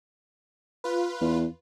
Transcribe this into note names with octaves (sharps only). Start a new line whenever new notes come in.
F4 B4
E2